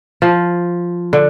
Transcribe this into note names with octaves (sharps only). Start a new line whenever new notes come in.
F3
D3